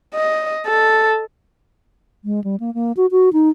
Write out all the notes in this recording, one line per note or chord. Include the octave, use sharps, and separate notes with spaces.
D#5
A4
G#3
G3
A#3
A#3
F#4
F#4
D#4